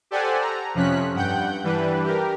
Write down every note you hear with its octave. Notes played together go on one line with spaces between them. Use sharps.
G4 A4 C5 D5 F#5 G#5
A#5
F2 C3 F3 C#4 F#6 B6
G2 F#5 G5 G6
E3 G3 D4 B4
G4 A#4